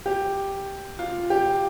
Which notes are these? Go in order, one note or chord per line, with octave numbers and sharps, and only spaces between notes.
G4
F4
G4